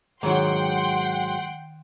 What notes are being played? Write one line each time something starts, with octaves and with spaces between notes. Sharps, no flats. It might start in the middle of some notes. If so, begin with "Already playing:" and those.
G#2 D#3 F#3 C#5 F#5 G5 C6